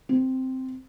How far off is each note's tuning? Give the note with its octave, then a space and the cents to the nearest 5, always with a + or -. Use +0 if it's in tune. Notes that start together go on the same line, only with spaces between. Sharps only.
C4 -5